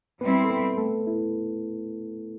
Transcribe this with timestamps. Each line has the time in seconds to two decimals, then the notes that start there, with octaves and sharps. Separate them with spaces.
0.21 G3 B3 C4 E4 B4
0.44 A4
0.50 B3 B4
0.78 A3 A4
1.07 E4